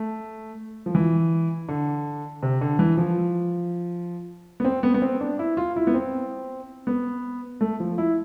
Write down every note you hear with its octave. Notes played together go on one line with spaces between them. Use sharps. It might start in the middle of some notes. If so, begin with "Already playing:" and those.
Already playing: A3
F3
E3
D3
C3
D3
E3
F3
B3
C4
B3
B3
C4
D4
E4
F4
E4
B3
C4
B3
A3
F3
E4